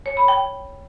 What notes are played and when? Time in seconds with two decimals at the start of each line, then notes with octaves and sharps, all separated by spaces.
0.06 C#5
0.17 B5
0.28 G5